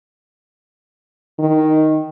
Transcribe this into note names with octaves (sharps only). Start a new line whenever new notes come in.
D#3